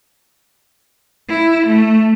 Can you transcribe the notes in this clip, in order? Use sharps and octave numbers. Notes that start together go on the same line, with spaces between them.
E4
A3